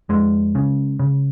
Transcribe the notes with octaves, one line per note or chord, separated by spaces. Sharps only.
F2 G#3
C#3
C#3